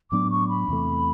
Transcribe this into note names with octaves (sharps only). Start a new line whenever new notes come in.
A2 F#3 B3 D4 D6
C#6
B5
E2 C3 E3 A3